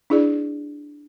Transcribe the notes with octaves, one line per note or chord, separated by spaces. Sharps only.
D4 E4 G#4 D5